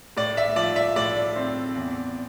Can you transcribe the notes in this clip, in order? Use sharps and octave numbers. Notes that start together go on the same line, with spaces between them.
A2 D5
E5
F3 D5
E5
A2 D5
C4
E2